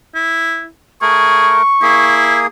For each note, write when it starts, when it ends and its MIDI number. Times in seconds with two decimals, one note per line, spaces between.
0.15 0.67 64
1.02 1.62 57
1.02 1.54 68
1.02 1.62 70
1.02 2.22 85
1.82 2.47 58
1.82 2.40 64
1.82 2.47 68